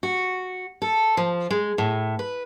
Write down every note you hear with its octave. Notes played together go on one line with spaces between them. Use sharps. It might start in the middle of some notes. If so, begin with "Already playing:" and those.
F#4
A4
F3
G#3
A2
B4